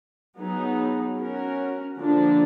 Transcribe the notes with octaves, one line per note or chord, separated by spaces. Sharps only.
F#3 B3 D#4 G#4
C#4 F#4 A#4
D3 F3 A#3 D4